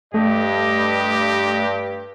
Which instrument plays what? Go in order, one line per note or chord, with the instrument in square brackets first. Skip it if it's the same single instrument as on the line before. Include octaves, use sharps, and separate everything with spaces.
[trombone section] G2 [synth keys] A3 [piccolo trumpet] G4 [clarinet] D#5